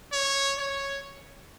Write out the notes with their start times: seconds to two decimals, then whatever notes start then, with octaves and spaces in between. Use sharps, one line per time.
0.12 C#5
0.58 C#5